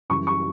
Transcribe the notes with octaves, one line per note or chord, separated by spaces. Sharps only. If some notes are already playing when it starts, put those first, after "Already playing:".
F#2 E3 G3 C#6
C#6